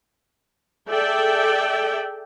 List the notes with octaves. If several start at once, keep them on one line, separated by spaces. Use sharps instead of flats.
G#4 A4 D5 E5 G5